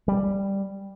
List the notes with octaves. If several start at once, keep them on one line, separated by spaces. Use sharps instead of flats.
G3